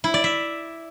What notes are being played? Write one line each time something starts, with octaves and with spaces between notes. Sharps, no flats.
E4
D5
E5